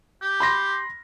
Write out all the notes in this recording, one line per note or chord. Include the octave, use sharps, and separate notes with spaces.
G4
B5 C6 A#6